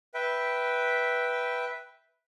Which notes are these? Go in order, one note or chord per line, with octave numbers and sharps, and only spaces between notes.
B4 E5 G5